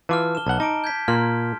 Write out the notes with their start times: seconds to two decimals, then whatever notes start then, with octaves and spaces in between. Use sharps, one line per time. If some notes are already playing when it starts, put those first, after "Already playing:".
0.09 E3 F4 A5 D6 F6
0.35 E7 G7
0.47 B1 F#5 A5 G7
0.60 D#4 A5 D6 D7
0.84 G6 G#6 B6
1.08 A#2 A#3 C6 F6